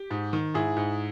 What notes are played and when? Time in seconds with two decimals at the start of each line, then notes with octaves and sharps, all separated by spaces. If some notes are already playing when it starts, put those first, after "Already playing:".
Already playing: G4
0.11 G#2
0.33 D#3
0.54 G#2 E4 G#4
0.77 G#2